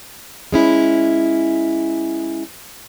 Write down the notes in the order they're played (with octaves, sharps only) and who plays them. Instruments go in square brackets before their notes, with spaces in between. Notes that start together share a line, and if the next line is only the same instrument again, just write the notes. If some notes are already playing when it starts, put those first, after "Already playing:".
[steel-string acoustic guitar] G#3 C#4 E4